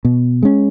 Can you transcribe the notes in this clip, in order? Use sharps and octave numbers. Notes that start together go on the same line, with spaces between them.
B2
G#3 C#4